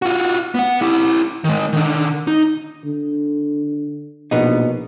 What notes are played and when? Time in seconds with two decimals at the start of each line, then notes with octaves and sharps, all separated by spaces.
0.02 F4 F#4
0.55 B3 F#5
0.81 E4 G4
1.44 D#3 G#3
1.73 D3 D#3
2.27 D#4
2.85 D3
4.31 A#1 B2 B3 D#4